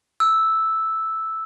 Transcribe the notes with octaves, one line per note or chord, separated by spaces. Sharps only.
E6